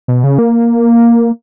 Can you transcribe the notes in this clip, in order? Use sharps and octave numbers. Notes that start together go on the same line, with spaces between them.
B2
C#3
A#3